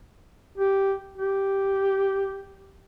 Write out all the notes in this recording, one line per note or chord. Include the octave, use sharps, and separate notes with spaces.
G4
G4